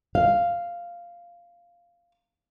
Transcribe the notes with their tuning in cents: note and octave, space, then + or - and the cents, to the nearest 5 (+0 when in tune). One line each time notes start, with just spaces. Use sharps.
F5 -5